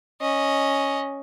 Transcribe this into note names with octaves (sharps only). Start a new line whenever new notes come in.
C#4 D#5